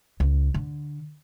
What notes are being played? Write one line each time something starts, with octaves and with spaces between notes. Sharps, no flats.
C#2
D3